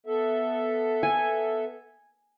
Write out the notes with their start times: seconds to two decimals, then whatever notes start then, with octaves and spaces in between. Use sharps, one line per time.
0.06 B3 A4 E5
1.03 G#5